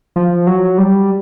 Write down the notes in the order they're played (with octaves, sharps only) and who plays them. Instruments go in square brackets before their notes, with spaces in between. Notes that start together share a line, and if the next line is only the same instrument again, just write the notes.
[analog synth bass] F3
F#3
G3